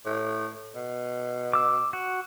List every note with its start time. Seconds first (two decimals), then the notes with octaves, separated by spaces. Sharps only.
0.06 A2
0.75 B2
1.53 D6 E6
1.93 F#4